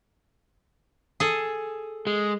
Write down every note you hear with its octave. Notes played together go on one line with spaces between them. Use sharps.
G#4 A4
G#3